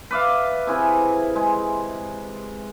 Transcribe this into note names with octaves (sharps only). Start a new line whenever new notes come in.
B4 D5 E5 F5
C3 E4 G#4 B4
G#3